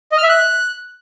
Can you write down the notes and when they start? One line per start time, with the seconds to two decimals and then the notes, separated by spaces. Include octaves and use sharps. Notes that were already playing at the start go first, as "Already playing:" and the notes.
0.12 D#5
0.18 F6
0.23 E5
0.29 F#6